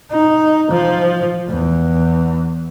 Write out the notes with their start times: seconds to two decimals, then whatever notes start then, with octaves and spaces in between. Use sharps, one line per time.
0.11 D#4
0.71 F3
1.48 E2